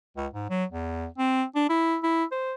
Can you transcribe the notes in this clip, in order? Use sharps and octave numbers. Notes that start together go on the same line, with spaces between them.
C#2
G#2
F#3
E2
C4
D4
E4
E4
C5